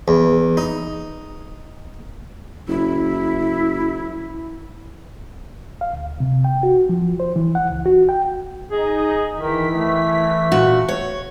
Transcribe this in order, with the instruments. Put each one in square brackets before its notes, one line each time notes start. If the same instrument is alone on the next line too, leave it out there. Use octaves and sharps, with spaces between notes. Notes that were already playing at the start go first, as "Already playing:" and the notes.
[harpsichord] E2
D#4
[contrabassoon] F#1 [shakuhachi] E4
[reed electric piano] F5
D2
C3
G5
F#4
F3
C5
E3
F#5
C#2
F#4
G5
[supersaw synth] D#4 D#5 [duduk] G#4
[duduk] D#3 [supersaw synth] E3 B6
[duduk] A3
[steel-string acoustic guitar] A#2 F#4
C#5